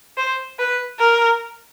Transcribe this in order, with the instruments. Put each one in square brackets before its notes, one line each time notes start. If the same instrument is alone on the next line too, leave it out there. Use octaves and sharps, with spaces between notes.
[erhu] C5
B4
A#4